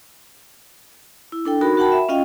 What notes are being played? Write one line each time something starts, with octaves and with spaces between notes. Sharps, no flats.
E4
D4 A4 G5
D#4 F#4 A#4 B5
F#4 A#4 F#5 G5 A5 B5
E5
C#4 F4 D#5 F5 G5